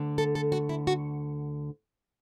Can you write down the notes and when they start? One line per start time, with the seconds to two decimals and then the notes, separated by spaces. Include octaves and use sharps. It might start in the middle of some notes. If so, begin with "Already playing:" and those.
Already playing: D2 D3
0.18 A4
0.35 A4
0.52 F#4
0.69 E4
0.87 F#4